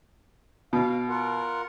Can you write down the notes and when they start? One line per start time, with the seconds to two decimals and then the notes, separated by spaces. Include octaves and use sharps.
0.73 B2 F5
1.08 F4 A#4 F#5